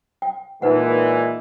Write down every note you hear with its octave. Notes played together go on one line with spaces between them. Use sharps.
G5
A#2 E3 G#3 D#4 B4 F#5